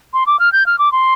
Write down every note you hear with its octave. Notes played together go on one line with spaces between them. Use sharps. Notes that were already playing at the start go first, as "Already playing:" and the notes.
C6
D6
F6
G6
F6
D6
C6